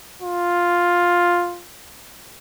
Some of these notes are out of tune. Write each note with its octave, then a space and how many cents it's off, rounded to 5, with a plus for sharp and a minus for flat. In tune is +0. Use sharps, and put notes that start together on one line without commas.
F4 +5